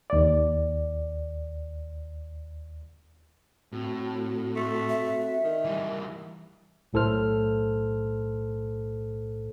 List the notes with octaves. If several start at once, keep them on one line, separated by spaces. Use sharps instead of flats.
D#2 D5
A2 C4 F#4
A3
E5
D#3
E3 G3
B1 A2 A4 C5 F6